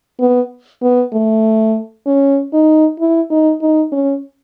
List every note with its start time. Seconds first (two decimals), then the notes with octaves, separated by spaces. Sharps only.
0.20 B3
0.82 B3
1.13 A3
2.06 C#4
2.53 D#4
3.00 E4
3.30 D#4
3.61 D#4
3.92 C#4